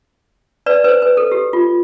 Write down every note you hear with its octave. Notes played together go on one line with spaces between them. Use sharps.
B4 D5
B4
C5
B4
A4
G4
F4